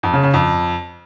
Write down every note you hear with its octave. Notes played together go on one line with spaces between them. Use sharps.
F2
C#3
C#3
F2